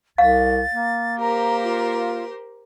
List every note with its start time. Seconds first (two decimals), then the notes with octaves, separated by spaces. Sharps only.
0.18 C2 F5 A6
0.74 A#3
1.20 G4 A#4 C5 A#5
1.63 F4